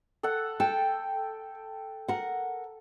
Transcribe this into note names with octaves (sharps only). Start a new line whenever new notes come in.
A4 F#5
A4 G5
A#4 F#5